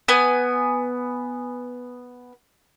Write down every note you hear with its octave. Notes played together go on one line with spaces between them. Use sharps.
B3 G#5